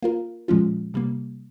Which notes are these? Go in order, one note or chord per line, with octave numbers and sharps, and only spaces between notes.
A#3 F4 A#4
A#2 F3 G#3 C#4 F4
C3 G3 A#3